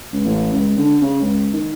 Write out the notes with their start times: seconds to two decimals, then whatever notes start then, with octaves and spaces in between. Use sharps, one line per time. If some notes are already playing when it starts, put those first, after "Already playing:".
0.13 C#2
0.25 A1
0.53 C#2
0.78 D3
1.02 C#3
1.22 C#2
1.53 D#3